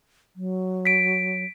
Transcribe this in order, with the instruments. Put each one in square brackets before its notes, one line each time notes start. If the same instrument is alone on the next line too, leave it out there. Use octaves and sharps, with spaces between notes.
[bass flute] F#3
[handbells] B6 D7